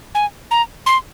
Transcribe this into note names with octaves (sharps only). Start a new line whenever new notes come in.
G#5
A#5
C6